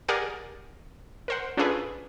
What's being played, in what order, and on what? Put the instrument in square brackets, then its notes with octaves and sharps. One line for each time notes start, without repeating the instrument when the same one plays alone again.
[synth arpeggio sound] G4 G#4 A#4 D5 F#5 G#5
A#4 C5 F#5
C#4 D4 F4 G#4 A4 B4